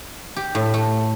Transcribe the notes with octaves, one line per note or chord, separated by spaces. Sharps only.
G4
A2
A3